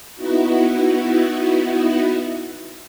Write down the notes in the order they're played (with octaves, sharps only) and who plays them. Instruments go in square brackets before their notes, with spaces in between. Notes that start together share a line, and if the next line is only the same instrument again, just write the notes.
[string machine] B3 D#4 E4 F#4